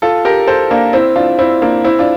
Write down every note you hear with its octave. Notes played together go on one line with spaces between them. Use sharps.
F4 A4
G4 A#4
A4 C5
A#3 D4
C4 E4
D4 F4
C4 E4
A#3 D4
C4 E4
D4 F4